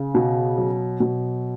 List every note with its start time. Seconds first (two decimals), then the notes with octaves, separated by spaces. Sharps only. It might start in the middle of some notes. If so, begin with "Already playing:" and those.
Already playing: C#3
0.15 B2
0.58 F#3
1.00 B2